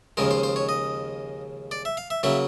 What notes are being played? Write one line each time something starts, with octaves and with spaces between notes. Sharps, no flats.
D#2 C#3 F3 G#3 A#4
C5
C5
C#5
D#5
D5
E5
F5
E5
C#3 F#3 A#3 E5